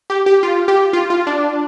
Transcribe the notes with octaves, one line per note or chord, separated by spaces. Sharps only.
G4
G4
F4
G4
F4
F4
D4